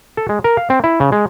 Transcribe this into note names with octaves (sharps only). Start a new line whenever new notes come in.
A4
G#3
A#4
F5
C4
E4
C#3
G#3